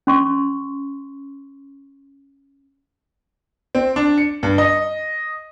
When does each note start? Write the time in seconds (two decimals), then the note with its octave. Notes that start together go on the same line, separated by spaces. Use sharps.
0.07 C#4 C6 C#6
3.75 C4
3.96 D4
4.18 C#7
4.43 G2
4.58 D#5